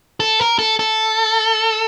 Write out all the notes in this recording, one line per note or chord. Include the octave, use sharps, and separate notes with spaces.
A4
A#4
A4
A4